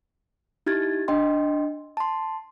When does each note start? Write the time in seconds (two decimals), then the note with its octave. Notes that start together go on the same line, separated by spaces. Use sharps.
0.66 D#4 E4 G4 G#6 A6
1.08 D4 D#5 G5 C6
1.97 A5 C6